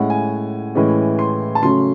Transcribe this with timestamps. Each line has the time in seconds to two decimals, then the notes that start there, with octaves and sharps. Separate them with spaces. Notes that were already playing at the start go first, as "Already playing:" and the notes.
Already playing: A2 G#3 C#4 F#5
0.10 G#5
0.75 A2 E3 G#3 C#4
1.19 C6
1.55 A5
1.63 C#3 F#3 A3 C#4 C6